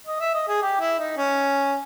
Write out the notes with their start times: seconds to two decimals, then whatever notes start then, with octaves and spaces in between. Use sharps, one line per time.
0.07 D#5
0.20 E5
0.34 D#5
0.48 G#4
0.62 G4
0.80 E4
0.99 D#4
1.17 C#4